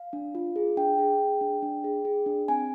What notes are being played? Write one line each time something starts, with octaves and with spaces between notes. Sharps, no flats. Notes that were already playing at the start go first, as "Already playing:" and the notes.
Already playing: F5
D4
F4
G#4
D4 G5
G#4
G#4
D4
D4
G#4
G#4
D4
C4 G#5